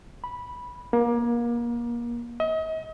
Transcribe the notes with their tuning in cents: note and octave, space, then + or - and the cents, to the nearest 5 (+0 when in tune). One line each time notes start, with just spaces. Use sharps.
B5 -10
A#3 +30
D#5 +40